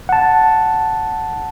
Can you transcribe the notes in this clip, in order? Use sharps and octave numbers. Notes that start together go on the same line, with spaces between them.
F#5 A5